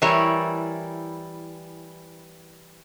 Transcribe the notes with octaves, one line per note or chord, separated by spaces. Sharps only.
E3 G3 E4 A#4 C#5